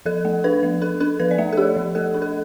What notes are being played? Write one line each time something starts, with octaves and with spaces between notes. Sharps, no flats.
F3 A4
A3
D4 B4
F3
D4 A4
D4 A4
F3 B4
D5
A3 E5
A4
D4 G4
F3
A3 A4
D4
A4